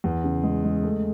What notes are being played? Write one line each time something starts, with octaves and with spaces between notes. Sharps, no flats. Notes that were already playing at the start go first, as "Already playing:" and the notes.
E2
C#3
G#3
G#3
A3